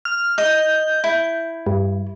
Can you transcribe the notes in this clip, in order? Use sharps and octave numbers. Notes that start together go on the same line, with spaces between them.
F6
D#5 G6
E4
G2